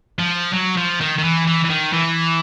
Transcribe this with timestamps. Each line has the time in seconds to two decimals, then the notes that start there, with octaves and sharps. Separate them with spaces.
0.19 F3
0.53 F#3
0.77 F3
1.01 D#3
1.18 D#3
1.24 E3
1.47 E3
1.65 E3
1.70 D#3
1.93 E3